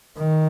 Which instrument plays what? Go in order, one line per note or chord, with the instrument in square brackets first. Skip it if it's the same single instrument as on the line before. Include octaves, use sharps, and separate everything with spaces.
[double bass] D#3